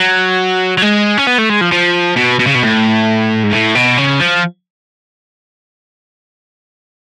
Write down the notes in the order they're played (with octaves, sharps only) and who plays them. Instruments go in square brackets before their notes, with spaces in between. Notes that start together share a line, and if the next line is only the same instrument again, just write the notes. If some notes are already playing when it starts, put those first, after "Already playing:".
Already playing: [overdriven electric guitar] F#3
F#3
G#3
C#4
B3
A3
G#3
F3
F3
B2
B2
C#3
B2
A2
G#2
A2
B2
C#3
F3